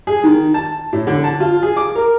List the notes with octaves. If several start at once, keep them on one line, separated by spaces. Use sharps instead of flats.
G#4
D#3
A5
A2
D3
A5
F4
G#4
D6
A#4